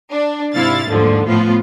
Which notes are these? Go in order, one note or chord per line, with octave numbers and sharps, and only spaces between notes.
D4
G#2 C3 E4 F5 A6
D#2 G#2 D3 F3
A2 F3 B3 F4